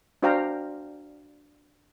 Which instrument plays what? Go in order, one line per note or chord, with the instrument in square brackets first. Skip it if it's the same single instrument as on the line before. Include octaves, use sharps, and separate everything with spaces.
[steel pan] D4 F#4 C5 F5 G5 A#5